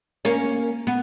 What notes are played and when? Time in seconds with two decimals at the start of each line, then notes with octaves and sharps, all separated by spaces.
0.25 A#3 C#4
0.87 B3